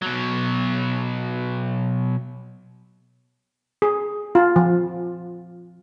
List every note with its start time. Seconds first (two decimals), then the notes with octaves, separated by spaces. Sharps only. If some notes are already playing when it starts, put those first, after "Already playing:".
0.02 B2 F#3
3.82 G#4
4.35 F4
4.56 F3